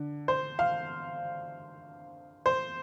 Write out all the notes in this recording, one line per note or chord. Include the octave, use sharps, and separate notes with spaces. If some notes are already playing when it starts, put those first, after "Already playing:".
Already playing: D3
C5
F5
C5